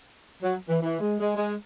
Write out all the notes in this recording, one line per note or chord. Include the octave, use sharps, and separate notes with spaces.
F#3
E3
E3
G#3
G#3
G#3